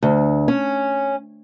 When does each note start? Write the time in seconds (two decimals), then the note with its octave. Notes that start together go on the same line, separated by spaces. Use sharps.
0.03 D2
0.48 C#4